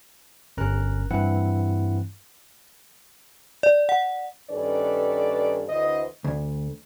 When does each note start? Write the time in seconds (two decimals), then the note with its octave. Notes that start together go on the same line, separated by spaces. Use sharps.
0.57 G1 C#4 A#4 A#5 F#6
1.11 G2 E3 C4 E4 F#5
3.63 D5
3.89 F#5
4.51 G2 D#3 C#4 A4 B4 D5
5.68 D2 D3 E3 C5 D#5
6.24 D2